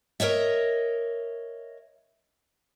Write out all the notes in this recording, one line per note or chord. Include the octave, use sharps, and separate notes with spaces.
A#4 C#5 D#5 E5